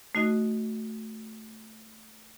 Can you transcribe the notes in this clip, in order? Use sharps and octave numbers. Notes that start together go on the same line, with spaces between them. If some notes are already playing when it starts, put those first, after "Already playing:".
A3 D#4 F#4 D#5